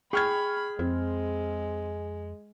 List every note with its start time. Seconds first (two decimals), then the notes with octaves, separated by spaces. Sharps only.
0.13 G#4 G5 B5 C#6 F6 G#6
0.79 F2 G#3 C4